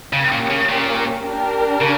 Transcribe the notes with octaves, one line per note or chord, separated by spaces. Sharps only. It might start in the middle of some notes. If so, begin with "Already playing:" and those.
C#3 A#3 C#4 G4
A#2
C#3
A#2
D4 G4 A#4
C#3